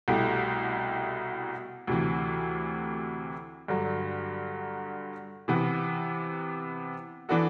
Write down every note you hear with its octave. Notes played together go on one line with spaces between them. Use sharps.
C2 B2 A3 E4 G4
D2 C3 E3
G2 D3 F#3
C3 E3 B3
E3 B3 D4 F#4 A4